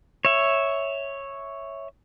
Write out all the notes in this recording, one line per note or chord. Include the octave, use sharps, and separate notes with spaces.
C#5 E5